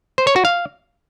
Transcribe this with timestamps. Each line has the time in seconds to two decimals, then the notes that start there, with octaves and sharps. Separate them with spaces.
0.18 C5
0.27 C#5
0.36 F#4
0.45 F5